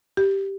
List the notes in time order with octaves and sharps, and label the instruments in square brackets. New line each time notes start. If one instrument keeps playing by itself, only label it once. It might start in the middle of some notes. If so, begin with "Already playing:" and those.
[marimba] G4